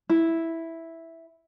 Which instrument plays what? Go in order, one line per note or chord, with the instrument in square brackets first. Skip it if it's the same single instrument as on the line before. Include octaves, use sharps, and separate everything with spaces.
[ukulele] E4